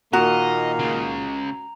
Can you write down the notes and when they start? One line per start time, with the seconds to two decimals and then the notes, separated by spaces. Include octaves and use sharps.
0.13 A#2 D#3 A#3 F#4 D#5 A#5 F7
0.79 C#2 C#3